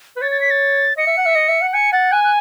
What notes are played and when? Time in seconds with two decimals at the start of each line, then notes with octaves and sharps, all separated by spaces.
0.16 B4
0.21 C#5 A6
0.31 A6
0.41 B6
0.51 A6
0.97 D#5 C#7
1.07 E5
1.17 F#5
1.26 E5
1.35 D#5
1.48 E5
1.61 F#5
1.73 G#5 C#7
1.92 F#5 A6
2.12 G#5 F#6
2.24 F#6